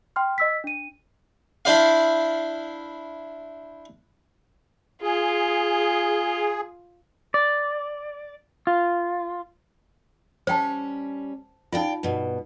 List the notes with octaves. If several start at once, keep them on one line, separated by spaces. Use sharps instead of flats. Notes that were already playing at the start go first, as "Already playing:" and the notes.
G5 C6 F6
D#5 E6 B6
D4 D#7
D4 E4 C5 D5 F5
F4 G#4
D5
F4
G3 C#4 C5 G5 A5
D#4 F4 D5 F5 G5
G2 B2